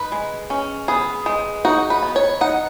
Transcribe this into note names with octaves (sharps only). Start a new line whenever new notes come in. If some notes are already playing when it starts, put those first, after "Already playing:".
Already playing: D#4 B4
G#3
C#4
B3 G#4
G#3
D#4 F#4
B4
B3
C#5
D#4 F#5